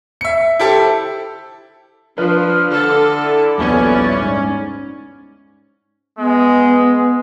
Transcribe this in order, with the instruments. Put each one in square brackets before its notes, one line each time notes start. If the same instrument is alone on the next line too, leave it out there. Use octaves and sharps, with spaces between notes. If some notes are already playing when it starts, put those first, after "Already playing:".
[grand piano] E5 C#7
E4 G4 A4 C5
[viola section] F3 [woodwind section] D4 F6 [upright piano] B4
[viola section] D3 A4
[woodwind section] E4 D5
[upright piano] D#1 A#1 B3 [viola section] C#4
[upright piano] G#2
[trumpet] G#3 [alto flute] B3